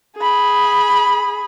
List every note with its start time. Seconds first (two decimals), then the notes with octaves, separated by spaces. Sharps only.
0.17 G#4 B5